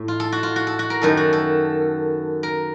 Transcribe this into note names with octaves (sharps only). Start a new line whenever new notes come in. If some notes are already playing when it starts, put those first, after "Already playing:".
Already playing: A2 A3
F4
A4
F#4
F4
F#4
A4
F#4
A#4
F#2 D#3 A3 A4
F#4
A4
A#4